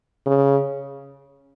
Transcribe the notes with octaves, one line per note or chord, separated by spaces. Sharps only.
C#3